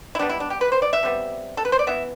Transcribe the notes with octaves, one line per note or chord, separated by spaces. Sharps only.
E4
B2 G3 B3 D4
E4
D4
G4
B4
C5
D5
E5
C3 G3 B3
A4
B4
C5
D5
E3 B3 E5